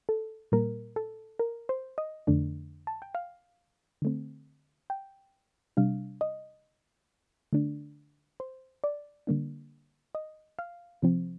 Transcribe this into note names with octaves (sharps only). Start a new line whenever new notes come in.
A4
A#2 G3 A#3 A#4
A4
A#4
C5
D#5
F2 D3 A3 D4
A5
G5
F5
D3 A3 C4
G5
C3 G3 D4 F5
D#5
D3 A3 D4
C5
D5
D3 G3 A#3 D4
D#5
F5
C3 F3 C4